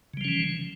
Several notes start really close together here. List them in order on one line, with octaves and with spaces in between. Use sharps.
C#3 G3 F3 C#4 E3